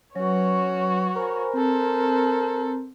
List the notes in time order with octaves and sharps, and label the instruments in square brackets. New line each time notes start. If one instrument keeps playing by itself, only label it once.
[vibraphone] F#3 B4 [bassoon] C#4 [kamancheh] F#4 C#5
[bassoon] A#4 [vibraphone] C5 G#5 B5
[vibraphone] C4 [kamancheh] A4 C5